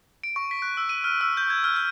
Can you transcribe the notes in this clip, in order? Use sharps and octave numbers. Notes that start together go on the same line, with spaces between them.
D7
C#6
B6
F#6
E6
D#7
F6
E6
G6
G#6
F6
F6